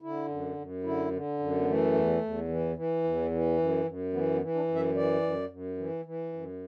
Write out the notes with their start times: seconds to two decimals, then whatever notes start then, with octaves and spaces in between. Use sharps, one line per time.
0.02 D3 E4
0.29 F#2
0.57 F#2
0.83 D3 E4
1.11 D3
1.39 F#2
1.59 B3
1.66 E3 A3
1.94 E2
2.21 E2
2.48 E3
2.76 E3
3.04 E2
3.31 E3
3.58 F#2
3.86 F#2
4.13 E3 B3
4.34 B3
4.41 E3
4.55 D4
4.68 F#2
4.75 E5
4.95 E3 D5
5.22 F#2
5.50 F#2
5.77 E3
6.05 E3
6.33 F#2